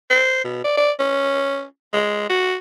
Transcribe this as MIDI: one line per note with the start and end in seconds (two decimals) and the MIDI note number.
0.10 0.44 72
0.44 0.61 47
0.64 0.77 74
0.77 0.91 74
1.00 1.64 61
1.93 2.29 56
2.30 2.55 66